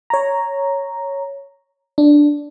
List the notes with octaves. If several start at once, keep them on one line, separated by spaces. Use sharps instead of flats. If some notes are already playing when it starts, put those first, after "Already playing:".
C#5 A#5
D4